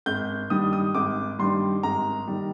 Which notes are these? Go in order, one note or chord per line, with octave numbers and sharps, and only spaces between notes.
G#1 G6
G2 D#3 G3 D#6
D#6
G#1 D6
G2 D#3 G3 C6
G#1 A#5
D#3 G3